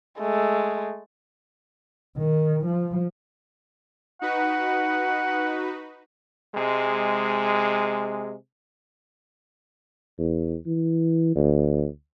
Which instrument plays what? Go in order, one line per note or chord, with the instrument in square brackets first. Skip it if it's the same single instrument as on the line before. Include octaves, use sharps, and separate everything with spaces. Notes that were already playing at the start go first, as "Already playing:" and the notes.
[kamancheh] G#3 A3
[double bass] D#3
F3
[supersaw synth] D#4 F#4 B4 [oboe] F#5
[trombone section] C3 G#3
[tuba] E2
E3
D2